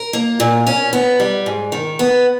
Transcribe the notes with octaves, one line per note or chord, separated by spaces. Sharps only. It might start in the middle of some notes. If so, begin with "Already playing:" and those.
Already playing: A#4
A#3
A#2
C#4
B3
G3
G#2
D#3
B3